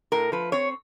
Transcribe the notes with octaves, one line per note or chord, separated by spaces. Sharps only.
A2 A#4
F3 B4
C4 C#5